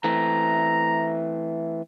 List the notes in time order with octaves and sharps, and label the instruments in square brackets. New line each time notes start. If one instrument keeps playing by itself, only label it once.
[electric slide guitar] E3 A3 C4 [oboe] A#5